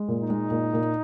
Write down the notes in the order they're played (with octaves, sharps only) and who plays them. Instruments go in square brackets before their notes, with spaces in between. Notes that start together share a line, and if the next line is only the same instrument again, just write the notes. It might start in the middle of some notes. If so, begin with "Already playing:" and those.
Already playing: [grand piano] G#3
A#2
[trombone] D#4
[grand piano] G#3
A#2
A#2